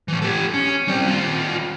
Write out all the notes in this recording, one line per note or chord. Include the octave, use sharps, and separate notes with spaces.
E3 A3
G4 A4
C#4
G3 C4
D#2 F4